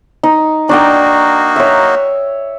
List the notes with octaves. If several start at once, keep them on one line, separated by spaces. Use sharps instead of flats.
D#4
A#3 D4 D#4 F#4 D5 G5
C#5 E5